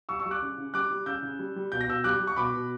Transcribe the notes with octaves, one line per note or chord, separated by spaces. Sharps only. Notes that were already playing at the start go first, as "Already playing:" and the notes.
G3 C#6 E6
C#6 E6
G3
D6 F#6
C#3
C#3
G3 D6 F#6
G3
C#3 E6 G6
C#3
G3
G3
B2 G6
A#6
B2 E6 G6
G3 D6 F#6
G3
C#6
B2 B5 D6
B2